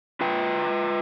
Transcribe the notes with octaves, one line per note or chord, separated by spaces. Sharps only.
F4 B4 G5